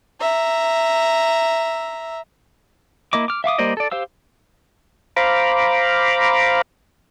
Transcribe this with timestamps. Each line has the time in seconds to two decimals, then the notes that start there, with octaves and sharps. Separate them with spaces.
0.21 E5 A#5
3.13 A#3 E4 D#5 D6
3.28 D6 F6
3.44 E5 F5 D6 D#6
3.59 G3 A#3 C5 D5 D#5
3.77 A4 D5
3.92 G4 C5 F5 E6
5.16 C5 F5 A#5 B5 D6